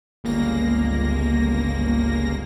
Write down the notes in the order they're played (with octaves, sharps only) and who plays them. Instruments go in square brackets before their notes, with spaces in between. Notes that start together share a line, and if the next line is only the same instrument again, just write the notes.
[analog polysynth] G1 C#2 A#3 A#6